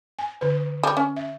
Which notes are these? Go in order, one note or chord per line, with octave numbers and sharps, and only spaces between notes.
G#5
D3 B4
G3 C#5
C#4
E5